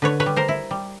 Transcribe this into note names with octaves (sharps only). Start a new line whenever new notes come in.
D3 B4 C#5
B4 C#5
G3
A#4 C5
E4
G3